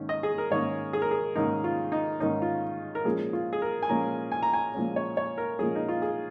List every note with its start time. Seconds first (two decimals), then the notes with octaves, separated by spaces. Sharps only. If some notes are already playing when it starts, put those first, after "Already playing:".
Already playing: G#2 D#3 A#3 C#4
0.09 D#5
0.23 G#4
0.38 A#4
0.50 G#2 D#3 A#3 C#4 C#5
0.93 G#4
1.02 A#4
1.11 G#4
1.35 G#2 D#3 A#3 C#4 D#4
1.64 F4
1.92 D#4
2.20 G#2 D#3 A#3 C#4 D#4
2.42 F4
2.95 A#4
3.05 A#2 F3 G#3 C#4 G#4
3.33 F4
3.53 G#4
3.62 A#4
3.83 G#5
3.89 A#2 F3 G#3 C#4 A#5
4.32 G#5
4.43 A#5
4.53 G#5
4.74 A#2 F3 G#3 C#4
4.96 C#5
5.17 C#5
5.38 A#4
5.59 A#2 F3 G#3 C#4 G#4
5.75 D#4
5.88 F4
6.02 G#4